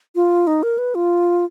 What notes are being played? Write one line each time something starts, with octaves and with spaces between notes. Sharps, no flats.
F4
D#4
A#4
B4
F4